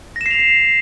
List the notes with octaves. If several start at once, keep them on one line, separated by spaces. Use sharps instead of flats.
A#6 C7 E7 F7